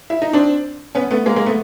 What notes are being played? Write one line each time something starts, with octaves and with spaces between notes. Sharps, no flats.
E4
D#4
C4 D4
B3 C#4
A3 B3
G#3 A#3
G#3 A#3
A3 B3